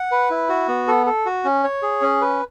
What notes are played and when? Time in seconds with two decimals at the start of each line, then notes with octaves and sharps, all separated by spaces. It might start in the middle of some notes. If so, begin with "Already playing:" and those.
Already playing: F#5
0.11 B4
0.30 E4
0.49 F#4
0.68 B3
0.88 A4
1.06 A4
1.26 F#4
1.45 C#4
1.64 C#5
1.82 G#4
2.02 C#4
2.21 B4